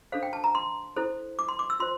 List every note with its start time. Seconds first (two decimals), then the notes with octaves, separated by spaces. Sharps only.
0.12 D4 A4 C5 F5
0.23 G5
0.33 A5
0.44 A#5
0.55 C6
0.96 E4 A4 C5
1.39 D6
1.48 C6
1.59 D6
1.70 E6
1.80 F4 C5 C6